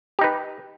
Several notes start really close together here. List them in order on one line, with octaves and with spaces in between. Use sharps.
G4 D#4 B4